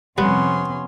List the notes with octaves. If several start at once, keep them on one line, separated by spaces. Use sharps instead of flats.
F2 C3 G3 B3 C#4 C6